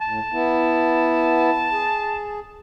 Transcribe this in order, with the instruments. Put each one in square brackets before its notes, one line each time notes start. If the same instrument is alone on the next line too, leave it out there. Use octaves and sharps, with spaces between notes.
[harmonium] A2 [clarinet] A5
[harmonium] B3 E4
G#4